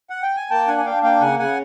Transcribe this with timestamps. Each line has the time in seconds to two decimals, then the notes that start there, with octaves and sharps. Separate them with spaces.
0.10 F#5
0.23 G5
0.37 G#5
0.50 A#3 G5 A5
0.68 D4 F#5 G#5
0.78 G#5
0.85 D4 F5 G5
1.03 A#3 F5 G5
1.21 C#3 F#5 G#5
1.39 C#3 F#5 G#5